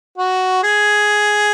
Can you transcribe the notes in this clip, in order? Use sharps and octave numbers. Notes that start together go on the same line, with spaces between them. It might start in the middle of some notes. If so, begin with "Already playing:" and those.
F#4
G#4